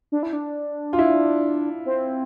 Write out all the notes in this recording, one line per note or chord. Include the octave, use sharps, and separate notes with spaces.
D4
E4
D4
F4
E4
C4